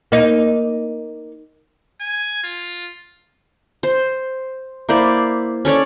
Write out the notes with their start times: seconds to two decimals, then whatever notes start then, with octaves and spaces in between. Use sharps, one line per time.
0.12 A#3 D#4
2.01 G#5
2.44 F4
3.83 C5
4.89 A#3 E4 C5 D5
5.65 C#4 A4 C#5 D5